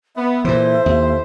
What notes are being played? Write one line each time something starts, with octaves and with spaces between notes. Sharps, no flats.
B3 E5
A#2 E3 E4 A4 C5
D#2